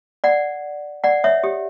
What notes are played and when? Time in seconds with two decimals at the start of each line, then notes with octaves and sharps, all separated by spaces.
0.24 D5 F#5
1.04 D5 F#5
1.24 C#5 E5
1.44 G4